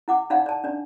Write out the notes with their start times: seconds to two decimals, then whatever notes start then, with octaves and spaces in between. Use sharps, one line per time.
0.08 E4 F#5 D6
0.30 D#4 D5 F5 F#5
0.46 D5 A5
0.64 D4 D5